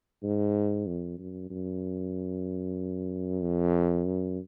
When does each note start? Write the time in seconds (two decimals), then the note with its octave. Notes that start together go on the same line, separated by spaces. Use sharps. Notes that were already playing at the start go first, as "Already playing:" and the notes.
0.23 G#2
0.87 F2
1.18 F#2
1.50 F#2
3.42 F2
4.05 F#2